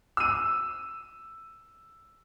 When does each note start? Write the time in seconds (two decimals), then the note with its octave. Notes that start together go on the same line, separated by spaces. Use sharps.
0.17 E6 D#7